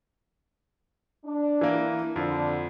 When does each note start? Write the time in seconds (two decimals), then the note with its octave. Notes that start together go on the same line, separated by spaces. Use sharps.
1.24 D4
1.61 E3 A#3
2.16 F2 D3